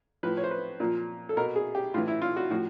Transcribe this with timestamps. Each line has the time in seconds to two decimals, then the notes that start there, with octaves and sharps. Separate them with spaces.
0.23 A2 F3 B4
0.37 C#5
0.44 C5
0.51 B4
0.80 A#2 F3
1.29 A4
1.37 B2 A#4
1.56 G#4
1.75 G4
1.94 A2 E3 F4
2.08 E4
2.22 F4
2.36 F#4
2.50 A2 F3 F#4